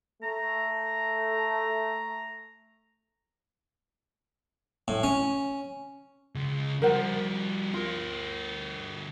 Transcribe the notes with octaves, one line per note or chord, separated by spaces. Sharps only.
A3 A#5
A2
C#4
C#2
F3 G3 A#4 C5 F#5
D2 F4 A#4